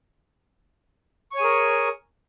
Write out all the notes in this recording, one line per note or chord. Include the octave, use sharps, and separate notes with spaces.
G#4 A#4 C#5 G#5 C#6